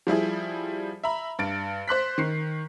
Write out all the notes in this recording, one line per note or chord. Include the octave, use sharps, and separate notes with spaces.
F3 G3 E4 G#4
E5 A#5 B5
G2 A6 D7
C5 C6 F#6 B6
D#3 C7